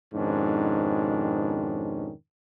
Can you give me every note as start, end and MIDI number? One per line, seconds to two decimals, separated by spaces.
0.14 2.13 41
0.14 2.13 44
0.14 2.13 47
0.14 2.13 51
0.14 2.13 61
0.14 2.13 62